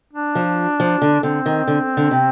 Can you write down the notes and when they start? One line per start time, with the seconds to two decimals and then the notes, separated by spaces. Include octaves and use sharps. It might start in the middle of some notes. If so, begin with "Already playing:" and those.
0.13 D4
0.35 F3
0.80 F3
1.02 D3
1.23 D3 C4
1.46 D#3
1.68 D3
1.97 D3
2.11 C3